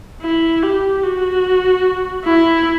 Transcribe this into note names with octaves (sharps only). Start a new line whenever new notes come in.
E4
G4
F#4
E4